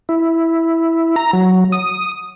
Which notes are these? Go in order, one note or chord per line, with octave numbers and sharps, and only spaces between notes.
E4
A#5
F#3
D#6